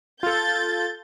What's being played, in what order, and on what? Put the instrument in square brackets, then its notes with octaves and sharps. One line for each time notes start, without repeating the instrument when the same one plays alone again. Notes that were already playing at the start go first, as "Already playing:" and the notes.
[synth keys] F4 A4 [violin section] G6 A6